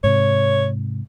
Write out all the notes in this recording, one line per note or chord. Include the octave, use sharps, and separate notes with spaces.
G#2 C3 C#5